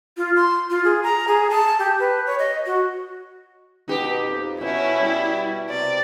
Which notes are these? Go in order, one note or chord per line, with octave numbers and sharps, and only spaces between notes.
F4
C6
F4
G#4
A#5
G#4
A5
G4
B4
C#5
D#5
F#4
B2 D#4 G4 B4
F2
B2 C#4 E4
G3
C3 D5